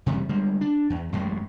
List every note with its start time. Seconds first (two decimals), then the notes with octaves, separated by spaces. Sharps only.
0.06 F2 C3 E3 G3
0.29 D3 G3 G#3
0.61 D4
0.90 E2
1.12 A1 F#2 A2 G#3